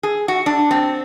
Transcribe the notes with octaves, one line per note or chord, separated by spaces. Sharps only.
G#4
F#4
D4
C4